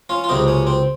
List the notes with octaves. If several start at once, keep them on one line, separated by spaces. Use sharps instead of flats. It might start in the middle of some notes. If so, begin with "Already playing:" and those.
C#4 F4
F4
C#2 C3 F#3 C4 D#4
C#4
C4